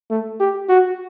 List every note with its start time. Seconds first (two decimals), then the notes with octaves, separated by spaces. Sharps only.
0.10 A3
0.40 G4
0.69 F#4